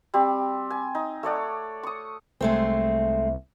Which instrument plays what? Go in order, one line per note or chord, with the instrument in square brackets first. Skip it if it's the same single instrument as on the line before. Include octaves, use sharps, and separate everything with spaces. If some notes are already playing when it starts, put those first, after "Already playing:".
[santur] G3 C4 G4
G#5
D#4
A3 C#5 D5 F#5
C#6 D#6
[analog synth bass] C2 [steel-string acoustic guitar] G#3 A3 C4